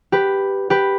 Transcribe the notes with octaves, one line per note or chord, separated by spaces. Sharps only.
G4 B4
G4 B4